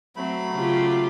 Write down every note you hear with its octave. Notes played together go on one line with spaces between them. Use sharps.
F#3 A3 C4 B5
C#3 F4 G4